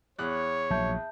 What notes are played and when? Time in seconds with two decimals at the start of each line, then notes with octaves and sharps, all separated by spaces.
0.19 E2 C#5 F#6
0.70 A#1 F#3 E5 A5 G6